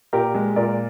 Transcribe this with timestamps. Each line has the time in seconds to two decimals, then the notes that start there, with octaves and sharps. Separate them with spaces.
0.13 A#2 G4 A#4
0.35 G#3
0.56 A#2 A#4 D5